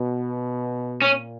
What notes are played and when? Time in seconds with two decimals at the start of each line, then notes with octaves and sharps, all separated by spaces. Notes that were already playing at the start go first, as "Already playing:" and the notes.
Already playing: B2
1.02 A#2 C#4